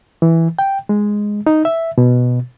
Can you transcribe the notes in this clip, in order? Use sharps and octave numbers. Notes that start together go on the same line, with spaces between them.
E3
G5
G#3
D#4
E5
B2